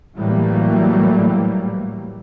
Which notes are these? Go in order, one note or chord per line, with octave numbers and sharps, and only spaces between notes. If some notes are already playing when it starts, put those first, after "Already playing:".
A2 E3 F#3 G3 A3 A#3